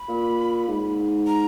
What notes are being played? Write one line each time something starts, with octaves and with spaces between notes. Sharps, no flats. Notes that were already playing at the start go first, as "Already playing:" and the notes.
Already playing: B5
A#2
G#2
A#5